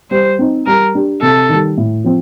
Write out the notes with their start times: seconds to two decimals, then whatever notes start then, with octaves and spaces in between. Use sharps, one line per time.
0.11 G3 C5
0.39 C4 D#4
0.66 G3 A#4
0.95 D4 G4
1.22 C3 A4
1.49 D#3 G3
1.77 A2
2.04 F3 C4